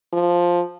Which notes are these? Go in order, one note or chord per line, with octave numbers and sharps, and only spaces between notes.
F3